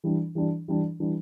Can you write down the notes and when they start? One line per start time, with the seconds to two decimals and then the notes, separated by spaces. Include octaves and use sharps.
0.04 E3 G3 D4
0.35 E3 G3 D4
0.68 E3 G3 D4
1.00 E3 G3 D4